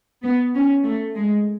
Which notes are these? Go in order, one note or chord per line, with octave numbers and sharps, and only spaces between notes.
B3
C#4
A3
G#3